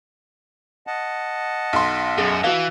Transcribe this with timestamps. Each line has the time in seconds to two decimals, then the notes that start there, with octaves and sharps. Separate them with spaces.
0.87 D#5 F#5 A5
1.73 B1 C6
2.18 F#2 G#4
2.44 E3 F#4 F5